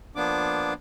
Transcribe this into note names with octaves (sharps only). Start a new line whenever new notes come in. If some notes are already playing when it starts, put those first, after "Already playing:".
F3 A#3 B3 D4 D6